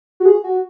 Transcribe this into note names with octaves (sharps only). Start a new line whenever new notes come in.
F#4
G#4
F#4